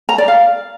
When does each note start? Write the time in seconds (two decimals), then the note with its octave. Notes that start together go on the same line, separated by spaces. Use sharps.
0.09 A#5
0.18 D5
0.28 F5